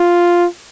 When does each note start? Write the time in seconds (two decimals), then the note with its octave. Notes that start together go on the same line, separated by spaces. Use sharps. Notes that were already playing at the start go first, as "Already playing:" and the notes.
Already playing: F4